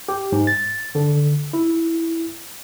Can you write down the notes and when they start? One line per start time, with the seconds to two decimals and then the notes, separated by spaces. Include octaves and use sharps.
0.09 G4
0.32 G#2
0.47 A6
0.95 D3
1.53 E4